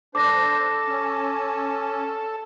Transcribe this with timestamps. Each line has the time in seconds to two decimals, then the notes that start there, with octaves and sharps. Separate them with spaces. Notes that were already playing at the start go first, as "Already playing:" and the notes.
0.15 D4 A4 C5 D6 A#6
0.87 C#4